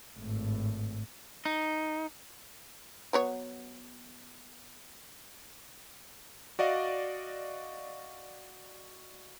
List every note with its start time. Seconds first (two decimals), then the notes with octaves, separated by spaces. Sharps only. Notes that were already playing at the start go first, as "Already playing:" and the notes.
0.18 G#1 A2
1.45 D#4
3.13 F#3 B3 C#5
6.59 F#4 D5 D#5 F5